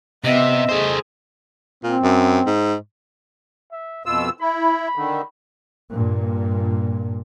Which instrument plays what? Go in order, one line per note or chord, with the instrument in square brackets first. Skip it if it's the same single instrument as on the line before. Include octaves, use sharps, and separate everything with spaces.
[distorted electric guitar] C3 [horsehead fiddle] B3 E5 [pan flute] D#5
[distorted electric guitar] A3 C5 [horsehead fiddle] G#4
[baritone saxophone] A#2 [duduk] C4
[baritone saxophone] F#2
G#2
[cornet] E5
[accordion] F2 B2 E6 [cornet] F4
[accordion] E4 [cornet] B5
[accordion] D3 D#3
[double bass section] G2 A#2